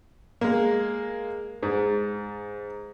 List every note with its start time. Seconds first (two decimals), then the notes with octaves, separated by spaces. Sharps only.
0.41 G#3 A#3
1.63 G#2